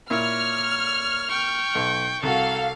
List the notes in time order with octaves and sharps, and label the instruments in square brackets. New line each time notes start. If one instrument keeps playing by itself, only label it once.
[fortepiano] A#2 E4 [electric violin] C#5 [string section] F6
[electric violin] G5 C#6
[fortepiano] B1
[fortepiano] C2 F#4 [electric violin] A4 [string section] F5